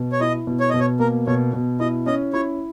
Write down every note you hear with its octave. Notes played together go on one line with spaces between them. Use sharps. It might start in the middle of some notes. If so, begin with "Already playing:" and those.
Already playing: B2
C#5
E4 D#5
B2
C#5
B2 D#5
C#5
A#3 A#4
B2 C#5
B2
E4 D#5
C#4 D#5
E4 C#5